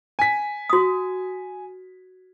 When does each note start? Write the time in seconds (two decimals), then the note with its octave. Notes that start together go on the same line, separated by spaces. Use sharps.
0.19 G#5 B6
0.70 F#4 D#6